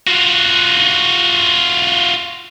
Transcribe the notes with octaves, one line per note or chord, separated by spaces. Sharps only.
F4 F#4